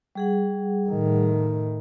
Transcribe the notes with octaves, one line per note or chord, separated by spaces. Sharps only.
G3 G#4 F#5
A2 D#3